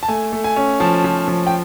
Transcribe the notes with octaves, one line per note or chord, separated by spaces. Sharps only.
A5
A3 G#5
A3
G#5
C#4
F3 A5
F3
F3
G5